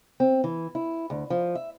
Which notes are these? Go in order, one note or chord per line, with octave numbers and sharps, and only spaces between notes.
C4
E3
E4
D2
F3
E5